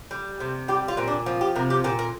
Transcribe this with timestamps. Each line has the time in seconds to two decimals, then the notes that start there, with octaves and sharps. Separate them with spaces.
0.11 G3
0.40 C3
0.68 G3 G4
0.88 F4
0.97 A#2 C4
1.08 D4
1.26 F3
1.41 G4
1.56 C3 A#4
1.70 G4
1.84 A#2 G4
1.99 A#4